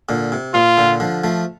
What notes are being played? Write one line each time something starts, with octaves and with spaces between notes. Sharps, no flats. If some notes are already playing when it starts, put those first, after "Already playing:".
A#2 D3
C3
A#2 F4
A#2 D3
D3 F3
F3 A3